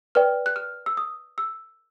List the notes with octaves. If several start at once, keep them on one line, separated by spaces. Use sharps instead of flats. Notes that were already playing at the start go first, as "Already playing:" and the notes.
B4 D5 G5 F6
F#6
F6
E6
D#6
E6